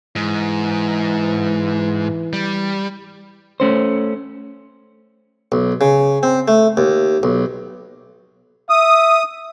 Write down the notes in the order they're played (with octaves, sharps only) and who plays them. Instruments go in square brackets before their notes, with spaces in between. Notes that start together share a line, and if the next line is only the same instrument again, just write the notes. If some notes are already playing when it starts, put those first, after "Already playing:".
[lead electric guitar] G#2 [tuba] E3
[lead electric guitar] G3
[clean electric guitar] A3 C#4 C5
[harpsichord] B1
C#3
C4
A3
D#2
B1
[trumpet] E5 [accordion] D#6